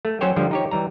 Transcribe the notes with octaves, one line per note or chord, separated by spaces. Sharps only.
A3
F#3 C#4 C5 C#5 G5
D3 F3 G3
D#4 G4 C#5
E3 G3 A#5